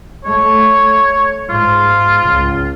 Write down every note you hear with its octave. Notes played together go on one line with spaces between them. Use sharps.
A3 C#5
G#2 F4
C#2